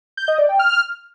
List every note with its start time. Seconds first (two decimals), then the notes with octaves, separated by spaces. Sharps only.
0.17 G6
0.28 D#5
0.38 D5
0.49 G5
0.59 F6